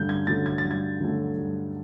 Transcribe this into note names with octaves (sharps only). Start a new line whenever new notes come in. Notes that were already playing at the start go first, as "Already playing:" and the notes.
Already playing: G2 D3 F#3 A3 G6
G#6
D3 F#3 A3 A6
G#6
A6
G2
G#6
D3 F#3 A3
G2